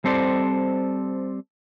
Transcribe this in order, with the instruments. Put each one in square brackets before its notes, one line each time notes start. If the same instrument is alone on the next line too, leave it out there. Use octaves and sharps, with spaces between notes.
[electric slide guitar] G3 C4 A4 C5 D5